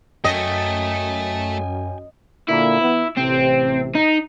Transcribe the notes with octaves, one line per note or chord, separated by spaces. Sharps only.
F#2 A3 A4 D#5 G5 G#5
A#2 D3 A#3 E4
E3 B3
A1 C3 C4
D#4